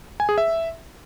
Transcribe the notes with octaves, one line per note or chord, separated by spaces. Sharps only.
G#5
G#4
E5